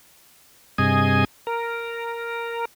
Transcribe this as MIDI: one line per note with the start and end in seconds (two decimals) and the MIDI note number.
0.78 1.25 43
0.78 1.25 48
0.78 1.25 68
0.78 1.25 75
0.78 1.25 80
1.47 2.65 70